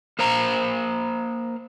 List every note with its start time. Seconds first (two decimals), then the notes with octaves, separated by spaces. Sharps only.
0.19 A#3 C5 F5 A#5